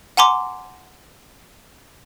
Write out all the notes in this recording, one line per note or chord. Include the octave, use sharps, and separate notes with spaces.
F#5 G#5 A#5 C6 D6